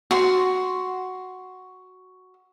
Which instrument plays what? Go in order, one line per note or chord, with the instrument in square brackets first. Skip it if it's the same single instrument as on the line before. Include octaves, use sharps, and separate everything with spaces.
[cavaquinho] F#4 C6